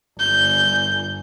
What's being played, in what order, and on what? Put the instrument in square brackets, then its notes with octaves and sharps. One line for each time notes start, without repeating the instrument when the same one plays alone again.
[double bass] G1 [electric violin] G6